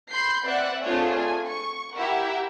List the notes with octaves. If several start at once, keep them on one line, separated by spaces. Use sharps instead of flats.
B5 C6 G6 C7
C4 B4 D5 E5 F#5 F#6
A3 C4 D4 F4 G#4 C#5
G#5
C#6
E4 G4 A#4 E5 F#5